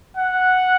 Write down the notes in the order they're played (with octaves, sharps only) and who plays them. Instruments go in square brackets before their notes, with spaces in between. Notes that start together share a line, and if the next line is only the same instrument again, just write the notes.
[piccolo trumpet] F#5